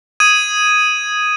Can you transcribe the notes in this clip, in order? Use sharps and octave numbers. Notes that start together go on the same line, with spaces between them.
D#6 G#6 D#7